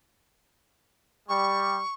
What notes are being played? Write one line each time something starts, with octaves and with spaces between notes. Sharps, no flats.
G3 C#6